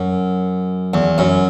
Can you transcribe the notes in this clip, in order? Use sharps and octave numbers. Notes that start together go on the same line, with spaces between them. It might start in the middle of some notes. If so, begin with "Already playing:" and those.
Already playing: F#2
E2
F#2